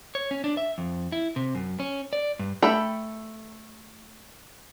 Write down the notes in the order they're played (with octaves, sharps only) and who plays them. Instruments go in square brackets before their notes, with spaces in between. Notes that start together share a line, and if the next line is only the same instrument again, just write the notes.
[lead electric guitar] C#5
C#4
D4
E5
F2
E4
C3
F#2
C#4
D5
G2
[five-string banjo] A3 A4 G5 B5